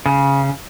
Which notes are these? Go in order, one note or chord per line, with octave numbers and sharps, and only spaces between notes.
C#3